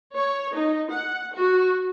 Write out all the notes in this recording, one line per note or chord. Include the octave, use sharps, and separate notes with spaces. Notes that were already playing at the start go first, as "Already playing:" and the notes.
C#5
D#4
F#5
F#4